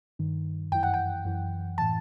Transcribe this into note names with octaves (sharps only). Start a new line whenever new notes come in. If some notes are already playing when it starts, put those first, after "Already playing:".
G2 D#3
F#2 E3 G5
F#5
G5
F#2 E3
A2 E3 A5